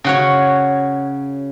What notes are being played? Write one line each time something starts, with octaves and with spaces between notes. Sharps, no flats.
C#3 F#4 C#5